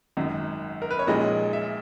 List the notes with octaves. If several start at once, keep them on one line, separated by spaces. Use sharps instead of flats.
G#1 F#2 D#3
A#4
B4
C#5
A#1 A#2 G#3 D#4 D#5
E5